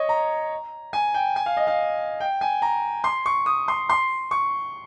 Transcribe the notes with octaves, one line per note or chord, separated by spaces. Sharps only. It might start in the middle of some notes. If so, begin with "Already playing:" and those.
Already playing: C#5 D#5
A#5
G#5
G5
G#5
F5
D#5
F5
G5
G#5
A#5
C6
C#6
D#6
C6
C6
C#6